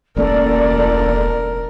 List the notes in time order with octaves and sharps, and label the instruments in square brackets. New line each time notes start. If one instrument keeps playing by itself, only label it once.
[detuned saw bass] E1 [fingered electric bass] A1 A#3 C#4 [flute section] A4 D5 [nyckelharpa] A#4